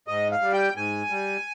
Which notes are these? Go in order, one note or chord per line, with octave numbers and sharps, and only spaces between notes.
G#2 D#5
F5
G3
G5
G#2 G#5
G3